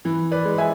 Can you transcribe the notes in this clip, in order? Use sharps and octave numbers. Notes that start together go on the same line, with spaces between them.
E3
B4 D5
G#3
E5 G#5